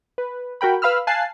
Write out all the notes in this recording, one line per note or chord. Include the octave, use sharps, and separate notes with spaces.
B4
F#4 A#4 G5 B5
B4 F5 B5 E6 F6
F5 G#5 A5 F#6 A6 C7